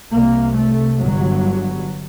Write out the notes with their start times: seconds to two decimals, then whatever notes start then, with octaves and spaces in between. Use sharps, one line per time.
0.12 C2 C3 A#3
0.57 A3
1.01 G1 G2 F#3